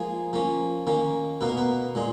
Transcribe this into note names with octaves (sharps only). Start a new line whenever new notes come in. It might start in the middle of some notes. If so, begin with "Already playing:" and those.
Already playing: F3 G#3 A#3 D#4 G#4
F3 A#3 C#4
D#3 A#3 C#4
B2 A#3 D#4 B4
A#4
B3 B4
A#2 G#3 D#4